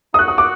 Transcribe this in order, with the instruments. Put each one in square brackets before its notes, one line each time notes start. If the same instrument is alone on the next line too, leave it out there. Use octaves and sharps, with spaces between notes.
[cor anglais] D#4 [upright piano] D#6
[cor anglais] F#4 [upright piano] F#6
[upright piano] D#6
D6